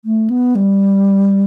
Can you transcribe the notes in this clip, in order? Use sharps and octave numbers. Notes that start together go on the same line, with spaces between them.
A3
B3
G3